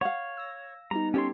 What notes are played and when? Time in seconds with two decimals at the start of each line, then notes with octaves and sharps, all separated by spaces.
0.01 C#5 F5 F#5
0.37 E6 A#6
0.91 G3 B3 D#4 A#5
1.14 C#4 G4 A4 C#5 C6